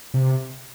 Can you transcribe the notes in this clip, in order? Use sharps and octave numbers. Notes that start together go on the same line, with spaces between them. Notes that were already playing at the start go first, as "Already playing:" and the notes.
C3